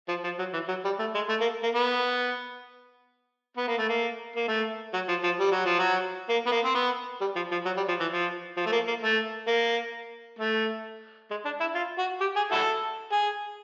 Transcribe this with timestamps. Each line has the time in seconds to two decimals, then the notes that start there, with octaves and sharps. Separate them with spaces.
0.08 F3
0.24 F3
0.39 F#3
0.53 E3
0.68 F#3
0.85 G3
0.99 A3
1.15 G#3
1.29 A3
1.41 A#3
1.63 A#3
1.75 B3
3.57 B3
3.68 A#3
3.78 A3
3.89 A#3
4.36 A#3
4.48 A3
4.94 F#3
5.09 F3
5.24 F3
5.39 G3
5.52 F#3
5.66 F3
5.79 F#3
6.29 A#3
6.46 B3
6.52 A#3
6.65 C4
6.75 B3
7.21 G3
7.36 F3
7.52 F3
7.66 F#3
7.77 G3
7.88 F3
8.00 E3
8.12 F3
8.57 F3
8.66 A3
8.72 A#3
8.88 A#3
9.03 A3
9.48 A#3
10.39 A3
11.30 G#3
11.45 D4
11.60 E4
11.75 F4
11.98 F#4
12.21 G4
12.36 G#4
12.52 E4 F#4 A4
13.12 G#4